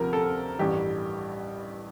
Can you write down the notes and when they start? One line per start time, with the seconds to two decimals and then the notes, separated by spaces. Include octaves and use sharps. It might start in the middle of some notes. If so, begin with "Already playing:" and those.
Already playing: D2 C3 F3 A#4
0.13 A4
0.59 A1 G2 E3 G3 G4